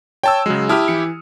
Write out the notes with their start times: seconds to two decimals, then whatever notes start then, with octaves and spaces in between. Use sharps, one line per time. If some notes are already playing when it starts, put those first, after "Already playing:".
0.23 C#5 G5 A5 E6
0.46 C#3 F#3 G#3
0.69 E4 G4 A5 D#6 F6
0.88 E3 C#7